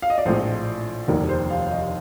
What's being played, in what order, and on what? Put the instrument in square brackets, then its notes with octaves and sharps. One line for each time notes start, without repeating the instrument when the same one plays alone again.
[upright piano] F5
D#5
D5
A#1 A2 F3 C5
F1 D#2 D#3 G3 A#4
C5
F5
F5
D#5